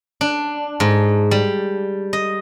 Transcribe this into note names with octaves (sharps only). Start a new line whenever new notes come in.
D4
G#2
G3
D#5